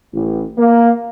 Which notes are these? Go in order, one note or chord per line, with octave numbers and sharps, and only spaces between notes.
A1
A#3